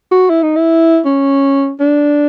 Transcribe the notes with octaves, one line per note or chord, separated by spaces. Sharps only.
F#4
E4
D#4
E4
C#4
D4